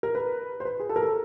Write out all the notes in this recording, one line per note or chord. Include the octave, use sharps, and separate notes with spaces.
A#4
B4
C5
B4
G#4
A4
A#4
A4